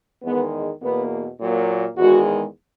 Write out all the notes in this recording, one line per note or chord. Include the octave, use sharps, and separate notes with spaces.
E2 D#3 G#3 B3
E2 B2 A#3 B3
A#2 F#3 A#3
E2 D#3 G#3 F#4